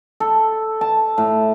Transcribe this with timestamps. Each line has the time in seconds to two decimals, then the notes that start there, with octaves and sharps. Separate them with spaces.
0.20 A4
0.81 A5
1.18 A2